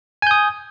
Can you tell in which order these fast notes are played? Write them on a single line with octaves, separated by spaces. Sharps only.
G#5 G6 D#6